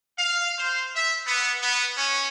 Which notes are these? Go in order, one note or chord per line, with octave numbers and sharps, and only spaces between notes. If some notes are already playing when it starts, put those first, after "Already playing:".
F5
C5
E5
B3
B3
C#4